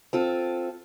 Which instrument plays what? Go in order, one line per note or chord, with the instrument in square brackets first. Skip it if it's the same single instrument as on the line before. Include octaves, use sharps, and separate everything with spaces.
[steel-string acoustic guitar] C4 F4 A4